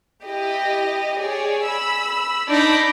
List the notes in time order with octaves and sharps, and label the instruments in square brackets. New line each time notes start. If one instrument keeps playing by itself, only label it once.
[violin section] E4 G4 D#5
G#4 C#5 D5
B5 E6
[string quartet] D4 D#4 [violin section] B5 D6 G6